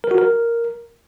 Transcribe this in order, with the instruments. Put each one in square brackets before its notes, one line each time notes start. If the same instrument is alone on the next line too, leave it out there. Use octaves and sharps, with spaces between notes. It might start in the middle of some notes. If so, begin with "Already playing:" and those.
[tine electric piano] A#4
F#4
A#4